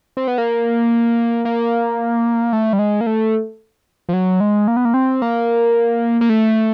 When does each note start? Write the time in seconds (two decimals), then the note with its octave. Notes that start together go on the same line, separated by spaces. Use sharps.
0.17 C4
0.28 B3
0.38 A#3
1.45 A#3
2.53 A3
2.73 G3
2.79 G#3
3.01 A#3
3.07 A3
4.09 F3
4.13 F#3
4.40 G#3
4.68 A#3
4.77 B3
4.85 A#3
4.94 C4
5.22 A#3
6.21 A#3
6.29 A3